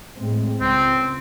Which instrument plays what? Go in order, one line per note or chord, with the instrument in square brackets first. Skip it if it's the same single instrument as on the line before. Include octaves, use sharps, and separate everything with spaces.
[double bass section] A2 G#3 C4
[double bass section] C#2 [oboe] C4